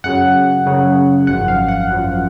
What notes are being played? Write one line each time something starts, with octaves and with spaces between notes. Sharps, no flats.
F#2 C#3 F#3 F#5
F#2 C#3 F#3
G#1 F#2 F3 F#5
F5
F#5
G#1 F#2 F3